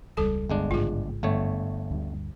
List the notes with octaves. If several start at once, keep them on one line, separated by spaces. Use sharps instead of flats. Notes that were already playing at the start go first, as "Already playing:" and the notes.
E1 C#2 G3 A4 A5
G1 G#3 D4
A1 G#2 C#3 F4 G#4
G1 A3 C#5
D2 G2